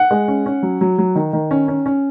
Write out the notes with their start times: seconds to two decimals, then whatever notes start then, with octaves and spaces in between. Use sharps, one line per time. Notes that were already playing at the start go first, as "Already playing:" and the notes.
Already playing: F#5
0.11 G#3
0.28 C#4
0.46 C#4
0.63 F#3
0.81 F#3
0.98 F#3
1.15 D#3
1.33 D#3
1.51 C#4
1.68 C#4
1.86 C#4